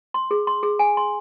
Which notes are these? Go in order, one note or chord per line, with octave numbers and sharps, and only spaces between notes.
C6
G#4
C6
G#4
G#5
C6